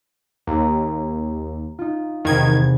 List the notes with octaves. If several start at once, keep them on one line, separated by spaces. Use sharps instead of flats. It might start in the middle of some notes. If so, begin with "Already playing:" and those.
D#2 A#5
D#4 F4
E2 C3 D#3 G#6